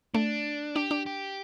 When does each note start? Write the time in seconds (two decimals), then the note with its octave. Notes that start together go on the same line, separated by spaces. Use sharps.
0.14 A3 D4
0.75 D4 G4
0.91 D4
1.06 G4